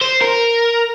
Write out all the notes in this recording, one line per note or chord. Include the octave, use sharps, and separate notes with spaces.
C5
A#4